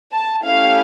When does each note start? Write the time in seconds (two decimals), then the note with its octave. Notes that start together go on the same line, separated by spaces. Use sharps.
0.12 A5
0.44 A3 C#4 E4 G4 F5